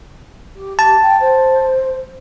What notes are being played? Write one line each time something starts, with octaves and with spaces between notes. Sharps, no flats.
G4
G4 A5
G5
C5